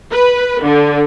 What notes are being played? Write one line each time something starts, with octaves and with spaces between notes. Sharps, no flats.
B4
D3